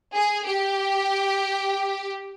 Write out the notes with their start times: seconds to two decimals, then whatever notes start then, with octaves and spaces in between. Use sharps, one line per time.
0.15 G#4
0.46 G4